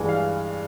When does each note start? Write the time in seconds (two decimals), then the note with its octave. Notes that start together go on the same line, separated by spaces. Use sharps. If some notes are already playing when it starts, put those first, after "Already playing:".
Already playing: G2 E3 G#3
0.09 F5